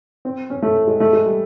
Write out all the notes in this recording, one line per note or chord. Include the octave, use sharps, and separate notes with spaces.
C4
C#4
A3
G#3
A3
G#3
G3